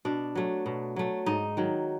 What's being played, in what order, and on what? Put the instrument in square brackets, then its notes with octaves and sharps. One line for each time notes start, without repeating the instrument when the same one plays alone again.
[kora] B2 D4
F#3 A3
B2
F#3 A3
G#2 D#4
D#3 F#3